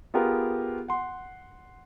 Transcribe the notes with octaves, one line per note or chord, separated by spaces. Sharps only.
B3 F4 G4 G#4 A#4
F#5 C6